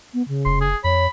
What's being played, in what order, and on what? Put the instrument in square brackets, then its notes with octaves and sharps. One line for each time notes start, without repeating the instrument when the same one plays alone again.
[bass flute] B3
C#3
[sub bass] F1 [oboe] C6
[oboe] G#4
[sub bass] F2 [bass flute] C#5 [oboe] B5